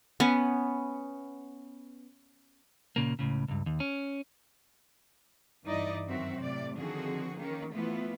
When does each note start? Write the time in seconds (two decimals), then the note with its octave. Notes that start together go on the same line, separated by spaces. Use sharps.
0.20 B3 C#4
2.96 A#2 C#3 A#3
3.19 C#2 A2 C#3
3.48 C#2 G2
3.66 D#2
3.80 C#4
5.64 G2 E3 D#4 E4 D5 D#5
6.06 F#2 D#3 F#3 C4 F#4 E5
6.37 A2 C3 D5
6.76 D3 D#3 F3 C4 F#4 G#4
7.36 D#3 A#3 C#4
7.72 E3 F3 A3 B3 E4 F4